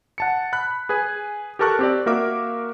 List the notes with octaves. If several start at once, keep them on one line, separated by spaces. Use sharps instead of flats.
F#5 A5 C#7
B5 F#6
G#4 B4 G#5
G4 A4 A#4 A5 C#6 F#6
C4 G4 D5
A#3 F#4 A#4 E5 F5 D6